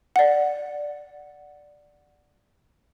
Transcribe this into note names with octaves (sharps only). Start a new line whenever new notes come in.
D5 F#5